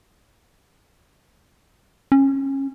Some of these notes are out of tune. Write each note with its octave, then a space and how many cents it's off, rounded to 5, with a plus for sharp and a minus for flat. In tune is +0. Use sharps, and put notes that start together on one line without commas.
C#4 -25